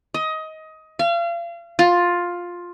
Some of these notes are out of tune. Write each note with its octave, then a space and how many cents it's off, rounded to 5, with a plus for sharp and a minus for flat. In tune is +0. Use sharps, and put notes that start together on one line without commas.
D#5 +20
F5 -35
F4 +10